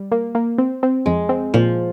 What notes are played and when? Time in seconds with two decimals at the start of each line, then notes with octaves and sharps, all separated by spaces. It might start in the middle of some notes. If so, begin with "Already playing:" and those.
Already playing: G3
0.12 A#3
0.35 A#3
0.58 C4
0.83 C4
1.06 F2 G#3
1.29 C4
1.54 A#2 F3